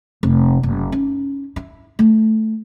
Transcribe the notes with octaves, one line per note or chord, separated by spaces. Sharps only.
F1
F#1
C#4 D#4
E4
A3